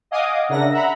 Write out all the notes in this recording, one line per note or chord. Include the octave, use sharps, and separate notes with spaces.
D#5 F5 F#5 G#5 D6 D#6
C#3 D4 A#4 E5 F#5 A#6
E5 F#5 A#5 B5